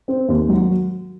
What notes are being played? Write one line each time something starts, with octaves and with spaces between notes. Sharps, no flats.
C4
D#2
F#3